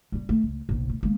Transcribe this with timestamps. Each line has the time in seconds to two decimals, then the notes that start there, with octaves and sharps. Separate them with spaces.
0.12 G3 C#4
0.29 A3
0.43 C#2
0.69 F#1 B1
0.90 A2
1.03 G#3 A#3